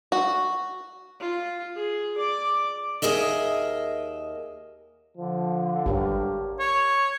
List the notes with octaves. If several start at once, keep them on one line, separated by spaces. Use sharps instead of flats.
F#4
F4
G#4
D5 D6
D#2 G#4 A#4 D#5 E5
D3 F3
G#1 G2 G4 A#4 C#5
C#5